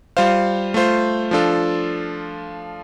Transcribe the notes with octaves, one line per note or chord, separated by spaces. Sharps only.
G3 F4 C5 F5
A3 F4 C5
F3 D4 F4 A4